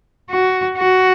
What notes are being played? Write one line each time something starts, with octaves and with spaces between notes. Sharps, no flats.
F#4
F#4